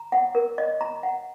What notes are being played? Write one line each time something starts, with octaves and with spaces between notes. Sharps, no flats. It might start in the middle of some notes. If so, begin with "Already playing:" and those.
Already playing: A#5
F#5
A#4
D#5
A#5
F#5